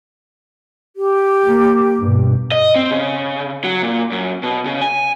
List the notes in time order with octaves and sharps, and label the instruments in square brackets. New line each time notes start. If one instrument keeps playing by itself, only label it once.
[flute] G4
[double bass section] A#3
G2 B2
[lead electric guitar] D#5
C4
C#3
F#3
A#2
F#2
B2
C#3
G#5